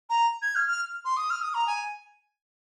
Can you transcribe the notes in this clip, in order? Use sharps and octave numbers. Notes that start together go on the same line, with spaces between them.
A#5
G#6
F6
F6
C6
D#6
F6
D#6
A#5
G#5